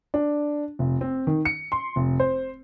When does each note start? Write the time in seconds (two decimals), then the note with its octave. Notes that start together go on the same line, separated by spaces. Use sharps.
0.14 D4
0.79 F1
1.01 C4
1.27 D#3
1.45 C#7
1.72 C6
1.96 F1
2.20 C5